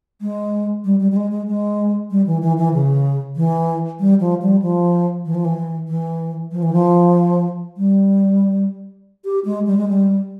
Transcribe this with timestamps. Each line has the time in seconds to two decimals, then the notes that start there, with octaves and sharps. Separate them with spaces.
0.21 G#3
0.85 G3
1.00 G3
1.12 G3
1.16 G#3
1.31 G#3
1.47 G#3
2.11 G3
2.26 E3
2.42 E3
2.57 E3
2.74 C#3
3.36 E3
4.00 G3
4.20 F3
4.42 G3
4.62 F3
5.26 E3
5.35 F3
5.45 E3
5.88 E3
6.52 F3
6.63 E3
6.73 F3
7.77 G3
9.25 G4
9.45 G#3
9.67 G3
9.77 G#3
9.89 G3